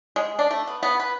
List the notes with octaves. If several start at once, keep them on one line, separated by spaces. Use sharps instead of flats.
G#3
D4
A3
B3
B3
B4